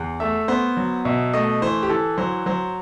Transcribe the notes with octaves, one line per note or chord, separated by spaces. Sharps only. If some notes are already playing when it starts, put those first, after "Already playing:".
Already playing: E2
A3 E5
B3 C5
F#3
B2 E5
A3 D#5
E3 C5
G4
E3 A4
F#3 C5
F#3 C5